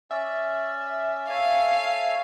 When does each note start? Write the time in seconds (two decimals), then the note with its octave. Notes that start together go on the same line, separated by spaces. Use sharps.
0.11 C#4 D5 E5
1.29 A4 C#5 F5 G#5